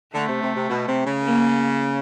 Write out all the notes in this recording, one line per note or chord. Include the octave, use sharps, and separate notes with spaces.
D3 A3
C3
C3
C3
B2
C3
C#3
A#3